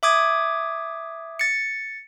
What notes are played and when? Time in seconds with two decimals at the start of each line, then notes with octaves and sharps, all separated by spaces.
0.03 E5 D6 D#6 G#6
1.39 A6 C#7